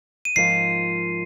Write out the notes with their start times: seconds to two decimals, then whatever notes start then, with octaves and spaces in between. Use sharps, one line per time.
0.25 D#7
0.36 G#2 F3 A#3 F4 C7